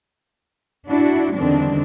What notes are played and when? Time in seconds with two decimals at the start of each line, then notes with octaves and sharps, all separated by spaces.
0.88 D4 E4 F#4
1.35 E2 D3 D#3 G3 C4 D4